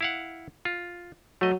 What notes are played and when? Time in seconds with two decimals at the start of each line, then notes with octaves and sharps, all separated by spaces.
0.01 E4 F5 F#5
0.65 F4
1.41 F#3 A3 D#5